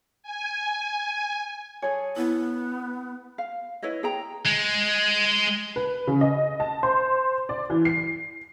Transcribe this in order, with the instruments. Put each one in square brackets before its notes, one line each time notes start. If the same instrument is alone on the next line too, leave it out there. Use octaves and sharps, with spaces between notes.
[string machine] G#5
[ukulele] G#4 A4 C#5 [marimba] G#5
[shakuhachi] B3 [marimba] E4
[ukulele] F5
E4 B4 C#5 D#5
G#4 G5 A#5
[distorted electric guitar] G#3
[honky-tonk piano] B4
C#3
D#5
A5
C5
D5
E3
C7